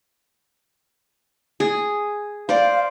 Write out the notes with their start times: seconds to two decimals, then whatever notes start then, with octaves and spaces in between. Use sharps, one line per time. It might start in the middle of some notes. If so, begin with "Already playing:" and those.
1.60 G#4
2.49 C5 D5 F5